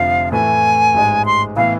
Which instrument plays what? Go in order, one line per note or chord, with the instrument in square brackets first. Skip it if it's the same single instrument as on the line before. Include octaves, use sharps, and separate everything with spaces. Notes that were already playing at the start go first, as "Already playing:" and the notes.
Already playing: [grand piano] F1 F2 D3 F3 [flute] F5
[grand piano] A2 E3 A3 [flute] G#5
[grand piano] A1 G#2 G#3
[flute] C6
[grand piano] A2 E3 B3 [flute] F5